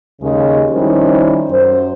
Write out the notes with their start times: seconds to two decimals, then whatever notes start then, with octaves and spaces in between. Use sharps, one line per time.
0.21 D#2 C#3 G#3
0.71 D#3 F3 G3 C4 C#4 E4
1.49 F#2 C5